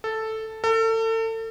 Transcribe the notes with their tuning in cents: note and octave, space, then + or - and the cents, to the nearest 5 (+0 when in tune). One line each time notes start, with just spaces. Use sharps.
A4 +0
A4 +35